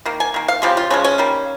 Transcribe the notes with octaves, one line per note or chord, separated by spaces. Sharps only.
D#3 A#3
G#5
D#3 A#3
F5
C#3 F3 G#3 G4
F4
C#3 F3 G#3 C#4
C#4
D#3 G3 A#3